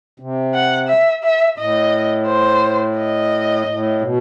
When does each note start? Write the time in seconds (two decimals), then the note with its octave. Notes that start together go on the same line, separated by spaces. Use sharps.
0.20 C3
0.54 F#5
0.88 E5
1.23 E5
1.58 A2 D#5
2.27 C5
2.97 D#5
3.67 A2
4.01 B2